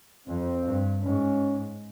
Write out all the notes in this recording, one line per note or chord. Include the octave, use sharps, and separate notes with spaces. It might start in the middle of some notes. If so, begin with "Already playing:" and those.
F2 C4
G2
G#2 C#4